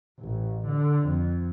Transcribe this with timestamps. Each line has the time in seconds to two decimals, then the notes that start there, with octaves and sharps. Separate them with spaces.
0.20 A1
0.66 D3
1.06 F2